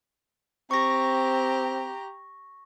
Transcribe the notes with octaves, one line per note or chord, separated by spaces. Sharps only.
C4 G4 A#5 C#6 A#6